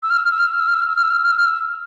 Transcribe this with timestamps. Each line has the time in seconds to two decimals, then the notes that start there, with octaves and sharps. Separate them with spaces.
0.03 E6
0.10 F6
0.17 E6
0.24 F6
0.31 E6
0.39 F6
0.46 E6
0.53 F6
0.60 E6
0.67 F6
0.74 E6
0.81 F6
0.88 E6
0.96 F6
1.03 E6
1.10 F6
1.17 E6
1.24 F6
1.31 E6
1.37 F6
1.45 E6